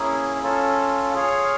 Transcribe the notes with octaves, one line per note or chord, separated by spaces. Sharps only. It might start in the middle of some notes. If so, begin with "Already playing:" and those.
Already playing: A#3 C#4 E4 G#4
C#4 F4 A4
F4 G#4 C#5 F5